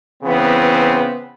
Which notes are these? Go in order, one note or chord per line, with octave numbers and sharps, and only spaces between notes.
C#3 E3 B3 C4